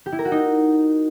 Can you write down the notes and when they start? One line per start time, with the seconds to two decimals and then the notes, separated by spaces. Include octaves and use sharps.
0.06 G4
0.12 E4
0.19 A#4
0.25 F#4
0.31 D#4